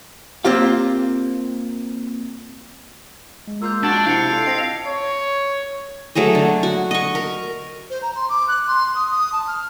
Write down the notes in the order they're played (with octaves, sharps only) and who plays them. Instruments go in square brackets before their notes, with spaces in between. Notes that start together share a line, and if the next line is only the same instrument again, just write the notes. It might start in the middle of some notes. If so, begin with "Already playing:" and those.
[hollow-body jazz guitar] A#3 C4 F4 G4 F5
[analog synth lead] G#3
[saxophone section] A#3 F4 [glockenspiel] E6 G6
[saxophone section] F3 F4 F#4 [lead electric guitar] D4 [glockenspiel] A5 G#6 A6
[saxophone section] C3 [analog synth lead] E4 [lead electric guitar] F5 [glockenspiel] G6 C#7
[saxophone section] D4 F4 A4
[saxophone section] C4 [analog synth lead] D#5 [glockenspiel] A#6 D7
[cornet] C#5
[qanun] F#3 A3 G#4 D#5
D3
F#4
D#5 C#6
A#4
[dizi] C5
A#5
C6
D6
F#6
C6
D#6
D#6
A5
F6